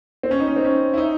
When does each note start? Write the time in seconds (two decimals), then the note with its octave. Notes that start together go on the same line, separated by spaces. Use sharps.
0.23 C4
0.31 C#4
0.40 D#4
0.48 C#4
0.56 C4
0.65 C#4
0.94 E4
0.98 D#4